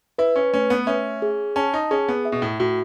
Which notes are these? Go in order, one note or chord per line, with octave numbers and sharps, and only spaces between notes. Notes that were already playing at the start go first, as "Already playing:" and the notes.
E4 B4
C#4
A3 C#4
B3
C#4 E5
G#4
C#4 A5
D#4
C#4 G#4
B3
E5
B2
A2
A2 F#4